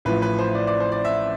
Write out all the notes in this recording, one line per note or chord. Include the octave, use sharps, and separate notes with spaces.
A1 A2 F3 B4
B4
C5
D5
D5
C5
D5
E5